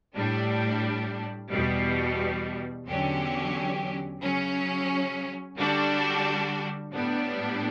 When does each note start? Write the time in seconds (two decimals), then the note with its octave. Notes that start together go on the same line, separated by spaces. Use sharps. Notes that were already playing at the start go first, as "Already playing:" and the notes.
0.16 A2 G3 D4
1.52 E2 B2 G3
2.87 E2 D3 F#3 C#4 G4
4.22 C#3 F#3 C#4
5.57 D3 G3 D4 F#4
6.93 A2 G3 B3 D4